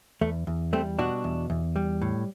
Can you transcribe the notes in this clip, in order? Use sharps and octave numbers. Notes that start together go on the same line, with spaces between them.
E2 A3
E2
G3 A3 C4
B2 D4 F#4
E2
E2
G3
A2